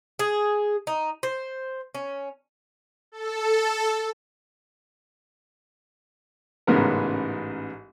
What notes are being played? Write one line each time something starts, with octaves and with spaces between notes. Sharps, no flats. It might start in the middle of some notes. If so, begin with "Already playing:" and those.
G#4
D#4
C5
C#4
A4
A1 G#2 C#3 B3 A#4